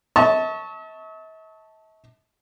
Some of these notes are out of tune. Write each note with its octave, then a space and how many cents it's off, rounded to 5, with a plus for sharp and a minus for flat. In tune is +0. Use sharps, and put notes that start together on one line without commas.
E5 -45 A5 +0 C#6 +0